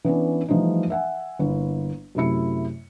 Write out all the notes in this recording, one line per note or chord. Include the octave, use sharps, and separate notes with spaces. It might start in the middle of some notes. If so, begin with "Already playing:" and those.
E3 B3 C#4 D4
E3 F3 G3 A3 D#4
E5 F#5 G#5
G1 A#3 E4
F#2 C3 A3 E4 C#7